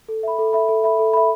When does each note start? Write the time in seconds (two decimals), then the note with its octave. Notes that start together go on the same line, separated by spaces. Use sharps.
0.08 A4
0.23 E5 B5
0.39 A4
0.53 E5 B5
0.69 A4
0.84 E5 B5
0.99 A4
1.13 E5 B5